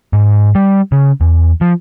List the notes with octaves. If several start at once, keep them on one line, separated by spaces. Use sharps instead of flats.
G#2
G3
C#3
E2
F3